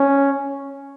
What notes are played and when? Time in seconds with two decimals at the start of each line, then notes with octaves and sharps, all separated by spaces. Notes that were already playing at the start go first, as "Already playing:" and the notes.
Already playing: C#4